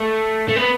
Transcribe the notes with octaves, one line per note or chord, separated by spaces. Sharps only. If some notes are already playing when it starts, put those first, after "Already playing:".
Already playing: A3
A3
B3